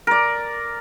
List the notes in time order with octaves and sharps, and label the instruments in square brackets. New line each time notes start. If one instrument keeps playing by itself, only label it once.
[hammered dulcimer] A#4 D5